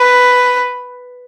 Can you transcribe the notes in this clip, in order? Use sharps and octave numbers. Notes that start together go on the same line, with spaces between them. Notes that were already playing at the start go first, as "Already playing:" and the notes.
Already playing: B4